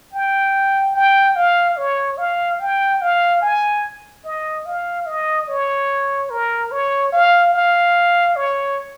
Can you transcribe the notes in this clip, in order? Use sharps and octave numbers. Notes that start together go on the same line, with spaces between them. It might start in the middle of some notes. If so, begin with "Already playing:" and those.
G5
G5
F5
C#5
F5
G5
F5
G#5
D#5
F5
D#5
C#5
A#4
C#5
F5
F5
C#5